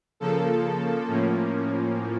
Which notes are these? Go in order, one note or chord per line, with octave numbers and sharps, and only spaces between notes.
C#3 F3 A#3 A4
A2 F3 A#3 C#4